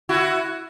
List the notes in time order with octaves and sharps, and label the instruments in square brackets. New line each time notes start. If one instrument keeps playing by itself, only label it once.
[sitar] E4 F#4